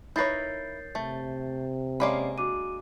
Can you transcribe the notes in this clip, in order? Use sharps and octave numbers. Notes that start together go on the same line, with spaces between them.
D#4 E4 A#4 B4 C#5 G6 A6 C7
C3 A3
G#3 A#3 C#4 D5 F5 B5
D4 F#4 D6 D#7